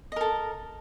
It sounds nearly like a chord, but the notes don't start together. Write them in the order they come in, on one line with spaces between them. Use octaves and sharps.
D#5 A#4 A4